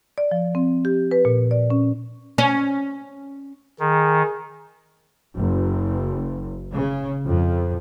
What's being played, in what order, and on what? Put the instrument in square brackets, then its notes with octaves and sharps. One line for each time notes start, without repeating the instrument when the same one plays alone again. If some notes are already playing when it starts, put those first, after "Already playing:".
[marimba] D5
F3
C4
G4
B4
A#2
D5
C#4
[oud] C#4
[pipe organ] D#3 [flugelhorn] G#4
[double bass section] F#1
C#3
F2